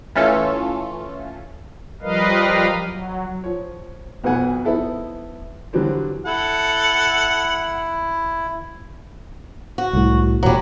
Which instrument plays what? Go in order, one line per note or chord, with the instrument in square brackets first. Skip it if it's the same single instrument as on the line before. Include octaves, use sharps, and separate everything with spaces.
[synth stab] E3 A3 C#4 F4 A4
[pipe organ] F3 G3 A#4 B4 D#5 F5
F#3
[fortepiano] F3 C#5
B1 F2 B2 B3 F#5 G#5
F3 B3 D#4 E4 A4
D3 E3 F#3 G3 C4
[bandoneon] E4 [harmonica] A4 F#5
[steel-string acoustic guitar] F#4
[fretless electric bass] C2 A2
[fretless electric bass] E1 A#2 [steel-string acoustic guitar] F#3 G3